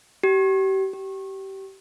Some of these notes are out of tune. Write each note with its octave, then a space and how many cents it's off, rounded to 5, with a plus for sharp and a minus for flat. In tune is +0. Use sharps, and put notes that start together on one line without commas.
G4 -35
G4 -25